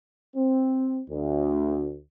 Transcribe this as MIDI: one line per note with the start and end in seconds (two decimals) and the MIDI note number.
0.36 1.01 60
1.10 2.00 38